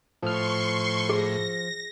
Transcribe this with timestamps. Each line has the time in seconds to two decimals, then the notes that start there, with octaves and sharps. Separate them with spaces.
0.23 A2 F3 C6 C#6 F6
1.09 G#4 A#6